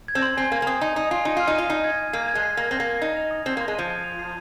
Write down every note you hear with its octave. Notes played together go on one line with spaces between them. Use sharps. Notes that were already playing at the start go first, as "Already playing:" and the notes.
G#6
C4
C6
C4 G#5
A#3 G#5
A#3
C4 D#6
D#4 D#6
D#4 D#6
F4 G#5
D#4 D#7
F4 F6
D#4
F4 D#7
D#4 C7
G#6
G#6
A#3 C7
G#6
G#3
C7
A#3 A#6
C4 A#6
A#3
A#6
D#4 C7
F7
D#6
C4 G#6
A#3 C6
G#3
F3 D#7
G#6
F7
C7